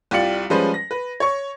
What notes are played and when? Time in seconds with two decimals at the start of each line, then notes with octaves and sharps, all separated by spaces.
0.11 C2 F4 G4 D5 C#7 F#7
0.50 F3 G3 G#3 C#4 B4 C5
0.74 A#6
0.91 B4
1.20 C#5 C#6